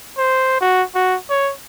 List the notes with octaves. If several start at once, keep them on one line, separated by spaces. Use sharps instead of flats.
C5
F#4
F#4
C#5